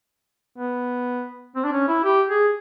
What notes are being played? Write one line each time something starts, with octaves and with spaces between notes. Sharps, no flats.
B3
C4
D4
C#4
E4
G4
G#4